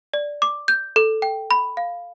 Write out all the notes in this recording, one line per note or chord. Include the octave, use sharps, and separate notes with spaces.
D5
D6
G6
A4
G5
B5
F5